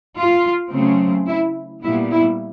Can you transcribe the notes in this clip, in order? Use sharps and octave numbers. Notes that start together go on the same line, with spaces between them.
F4
C#3 F#3 A3 C4
E4
A#2 G3 B3 E4
E4